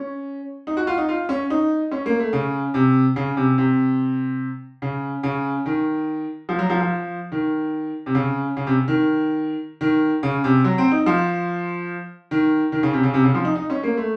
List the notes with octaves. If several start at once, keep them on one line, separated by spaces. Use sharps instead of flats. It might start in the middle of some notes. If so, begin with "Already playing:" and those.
Already playing: C#4
D#4
F#4
F4
D#4
F4
C#4
D#4
C#4
A#3
A3
C#3
C3
C#3
C3
C3
C#3
C#3
D#3
F3
F#3
F3
F3
D#3
C3
C#3
C#3
C3
D#3
D#3
C#3
C3
F#3
C4
D#4
F3
D#3
D#3
C#3
C3
C#3
C3
C#3
F3
D#4
D#4
C#4
A#3
A3